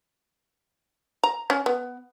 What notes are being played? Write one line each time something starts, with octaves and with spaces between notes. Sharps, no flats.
A#5
C#4
B3